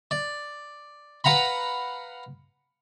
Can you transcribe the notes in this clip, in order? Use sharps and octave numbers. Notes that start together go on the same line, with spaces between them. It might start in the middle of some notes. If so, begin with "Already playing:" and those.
D5
B4 F5 F#5 A#5 B5